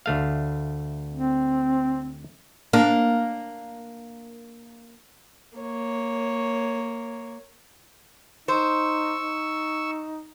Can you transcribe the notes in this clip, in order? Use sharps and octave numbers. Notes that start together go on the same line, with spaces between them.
D2 A3 F5
C4
A#3 D4
A#3 C#5
D#4 C5 C#6 E6
D#4